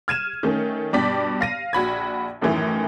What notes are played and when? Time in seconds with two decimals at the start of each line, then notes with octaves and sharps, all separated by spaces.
0.08 F6 G#6 D#7 E7
0.43 D#3 A3 C#4
0.93 G2 B2 D5 G5 B6
1.41 F5 A#6 D#7
1.73 A#1 F#4 B5 G#6
2.42 F#2 A2 D#3 E3 A3 E4